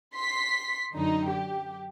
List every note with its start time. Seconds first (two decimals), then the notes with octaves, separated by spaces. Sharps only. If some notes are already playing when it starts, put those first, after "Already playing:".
0.15 C6 B6
0.95 F#2 D3 D#4
1.28 G4